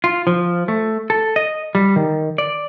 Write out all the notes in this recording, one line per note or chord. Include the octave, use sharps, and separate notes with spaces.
F4
F3
A3
A4
D#5
G3
D#3
D5